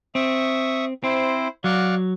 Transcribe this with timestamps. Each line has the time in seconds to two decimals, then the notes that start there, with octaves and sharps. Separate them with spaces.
0.15 C4 E5 C#6 D#6
1.04 C4 E4 C5
1.64 F#3 D5 F5 F#5